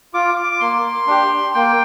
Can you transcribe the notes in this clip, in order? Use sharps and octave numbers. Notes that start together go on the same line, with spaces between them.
F4 D6
D6
D6
A#3 C6
D4 G4
A#3 G5